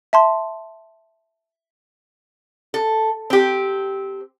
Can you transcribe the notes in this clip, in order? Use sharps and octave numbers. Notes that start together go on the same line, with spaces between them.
E5 A5 C6
A4
C4 G4